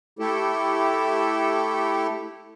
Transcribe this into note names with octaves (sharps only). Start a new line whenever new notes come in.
A3 E4 G4 A4